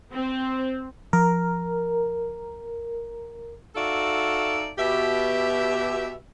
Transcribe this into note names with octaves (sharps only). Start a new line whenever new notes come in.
C4
F3 A#4
D#4 F#4 A4 D5 E5 F5
B2 G4 E5